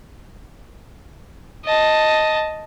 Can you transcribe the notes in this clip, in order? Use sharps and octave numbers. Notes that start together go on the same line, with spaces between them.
D#5 A5